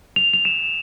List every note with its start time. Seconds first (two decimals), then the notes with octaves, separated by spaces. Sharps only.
0.16 F7
0.33 F7
0.45 E7